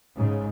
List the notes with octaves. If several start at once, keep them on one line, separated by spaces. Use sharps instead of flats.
G#2 C#3